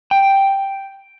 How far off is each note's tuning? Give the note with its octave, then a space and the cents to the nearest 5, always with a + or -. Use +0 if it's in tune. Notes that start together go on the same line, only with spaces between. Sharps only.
G5 +0